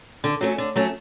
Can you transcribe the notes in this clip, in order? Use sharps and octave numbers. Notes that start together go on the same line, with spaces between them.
D3
F#3 A3 C#4
D3
F#3 A3 C#4